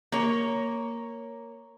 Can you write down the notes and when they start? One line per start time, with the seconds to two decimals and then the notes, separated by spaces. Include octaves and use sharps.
0.12 A#3 C#5